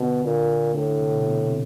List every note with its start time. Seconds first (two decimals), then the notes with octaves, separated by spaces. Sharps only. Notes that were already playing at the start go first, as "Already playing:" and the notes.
Already playing: B2 D3
0.24 A#2 D3
0.75 A2 D3
0.87 D3
0.99 C3
1.12 B2
1.25 B2
1.49 C3